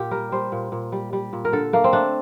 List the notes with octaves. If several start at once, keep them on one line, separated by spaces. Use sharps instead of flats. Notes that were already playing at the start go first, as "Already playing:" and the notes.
Already playing: A#2 G4
G3 A#4
G3 C5
A#2
A#2
G3
G3
A#2
A#4
D3 A4
A3 A#3
C4
A3 D4